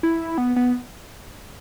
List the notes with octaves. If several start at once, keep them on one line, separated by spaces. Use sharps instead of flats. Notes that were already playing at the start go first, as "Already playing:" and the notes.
E4
B3
B3